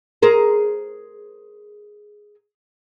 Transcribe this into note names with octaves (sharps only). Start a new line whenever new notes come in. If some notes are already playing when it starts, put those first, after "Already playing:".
G#4 A#4 C5